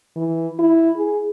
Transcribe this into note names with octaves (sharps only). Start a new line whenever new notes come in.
E3
E4
G#4